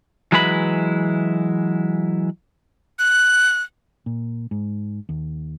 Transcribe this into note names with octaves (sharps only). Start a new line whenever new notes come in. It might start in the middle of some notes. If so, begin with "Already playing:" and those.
E3 F#3 G#3 E4 B4 B5
F#6
A#2
G#2
D#2